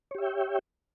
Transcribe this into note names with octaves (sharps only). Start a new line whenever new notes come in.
G4 C#5 E5 G5